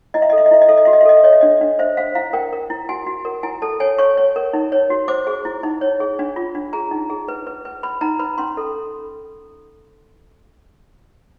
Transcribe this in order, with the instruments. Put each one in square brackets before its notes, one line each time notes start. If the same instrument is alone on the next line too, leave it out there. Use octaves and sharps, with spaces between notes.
[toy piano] E4 D#5
E5
A4 D#5
E5
D#5
E4 E5
D#5
A4 E5
D#5
F#4 E5
D#5
E5
A4 D#5
E5
C#5 D#5
E5
D4 D#5
D4
C5 E5
C5 F5
E4 F5
A#4 G5
A#4
E4
F#4 G#5
F#4
A#4
E4 G#5
A4 A5
C#5 G#5
C#5 C#6
C#5
A#4
D#4
C#5
F#4
C5 D6
G#4
E4
D#4
C#5
G#4
D4
F4
D4
G#4 A#5
D#4
G#4
B4
B4
B4
B4 B5
D#4 A#5
B4 B5
C#4 C6
A4